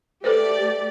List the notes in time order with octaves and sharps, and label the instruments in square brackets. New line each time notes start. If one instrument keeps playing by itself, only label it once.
[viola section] A3 G4 D5 [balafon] A4 B4 C5